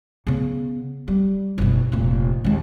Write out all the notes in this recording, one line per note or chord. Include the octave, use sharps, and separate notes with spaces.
C#3 B3
G3
F#1 B2
F1 A#2
D#2 G#3